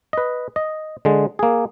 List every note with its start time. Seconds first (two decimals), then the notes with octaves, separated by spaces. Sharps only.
0.13 B4 D#5
0.56 D#5
1.05 D3 G#3
1.39 A#3 G#4